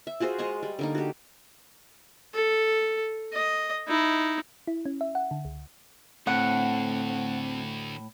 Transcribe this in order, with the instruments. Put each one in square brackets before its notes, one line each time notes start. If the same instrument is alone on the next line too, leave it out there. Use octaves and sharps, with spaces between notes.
[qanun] E5
F4 F#4 G#4 C5
G#3 G#4 D#5 C#6
G3
D3 A#3 D#4
F#4 G4
[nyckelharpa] A4
D#5
D#4 E4
[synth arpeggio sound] E4
C#4
E5
F#5
D3
C#2
[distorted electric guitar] D2 [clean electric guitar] A2 [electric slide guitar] C4 [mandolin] F#5